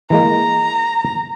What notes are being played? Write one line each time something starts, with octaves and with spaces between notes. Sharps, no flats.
E3 G#3 A#3 A#5